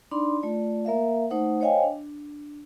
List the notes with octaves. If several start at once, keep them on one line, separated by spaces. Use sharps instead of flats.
D4 D#4 D5 B5 C6
A3 F4 D5
A#3 A#4 E5 F5
A3 D#4 C5 F#5
C5 C#5 D#5 F5 G5 G#5
D4